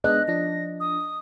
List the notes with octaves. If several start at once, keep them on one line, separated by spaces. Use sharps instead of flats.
G#3 B3 D4 D#5 F#6
F3 D4 A#6
D#6